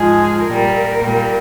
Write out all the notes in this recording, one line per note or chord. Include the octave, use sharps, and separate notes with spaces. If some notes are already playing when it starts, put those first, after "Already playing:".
Already playing: G#2 F3 G#3 G#4
A#2 G3 A#4
A#2 G3